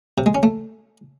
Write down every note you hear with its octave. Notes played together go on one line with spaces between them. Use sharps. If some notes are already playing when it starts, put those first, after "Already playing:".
C3
G#3
C#4
A3